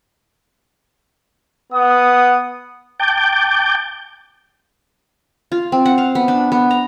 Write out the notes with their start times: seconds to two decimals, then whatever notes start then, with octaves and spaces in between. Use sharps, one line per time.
1.73 B3 F#5 D#6
2.99 G5 A5 D6 G6
5.52 F4
5.72 C4
5.85 F#5
5.98 F5
6.15 B3
6.28 D4
6.52 B3
6.71 A#5